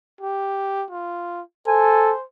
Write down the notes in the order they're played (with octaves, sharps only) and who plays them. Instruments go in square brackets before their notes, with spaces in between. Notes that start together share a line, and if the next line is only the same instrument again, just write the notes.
[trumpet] G4
F4
[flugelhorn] A4 [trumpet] C5 [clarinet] G#5